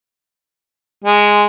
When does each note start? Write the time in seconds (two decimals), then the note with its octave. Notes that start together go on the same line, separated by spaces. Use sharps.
1.04 G#3